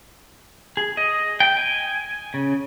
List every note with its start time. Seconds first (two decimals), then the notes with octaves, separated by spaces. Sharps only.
0.77 G#4
0.97 D#5
1.40 G5
1.57 G#5
2.34 C#3